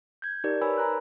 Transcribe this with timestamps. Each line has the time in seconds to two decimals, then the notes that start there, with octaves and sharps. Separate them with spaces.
0.22 G6 G#6
0.44 D#4 G4 A#4 D5
0.61 A#4 B4 C#5 G#5 B5 E6
0.78 G#5 A#5 F#6